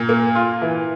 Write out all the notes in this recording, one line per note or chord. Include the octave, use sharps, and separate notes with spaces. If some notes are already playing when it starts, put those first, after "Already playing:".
Already playing: A#2
A#3
F4
E3